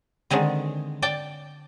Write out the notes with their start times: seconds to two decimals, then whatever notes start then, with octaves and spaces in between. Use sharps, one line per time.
0.30 D3 D#3 G#3 C4
1.02 D5 G5 A5